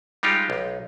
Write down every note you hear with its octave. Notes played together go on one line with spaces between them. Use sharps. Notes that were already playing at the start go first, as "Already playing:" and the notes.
G3 G#3 D#4 F4 G4
B1